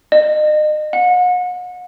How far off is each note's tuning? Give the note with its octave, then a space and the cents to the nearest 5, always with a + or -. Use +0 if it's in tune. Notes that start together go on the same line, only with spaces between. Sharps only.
D#5 -35
F#5 -40